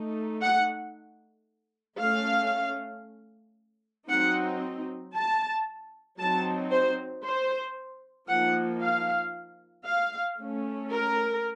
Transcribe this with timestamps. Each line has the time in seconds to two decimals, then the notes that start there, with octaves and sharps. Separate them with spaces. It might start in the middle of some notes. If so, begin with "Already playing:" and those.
Already playing: A3 D#4
0.41 F#5
1.98 A3 C#4 F5
4.08 F#3 C4 D#4 F#5
5.14 A5
6.18 F#3 C4 D#4 A5
6.71 C5
7.23 C5
8.28 F3 A#3 D#4 F#5
8.81 F5
9.86 F5
10.38 A3 C#4
10.91 A#4